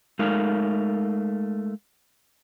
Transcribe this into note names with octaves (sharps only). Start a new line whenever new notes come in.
G#3 A3 D#4 A#4 F5